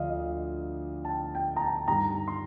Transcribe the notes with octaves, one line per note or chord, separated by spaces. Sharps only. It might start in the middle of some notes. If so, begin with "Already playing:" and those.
Already playing: D2 D3 F3 D5 D#5 F5
D#5
A5
G5
G5
A#5
A5
G2 D#3 G3 A#5
C6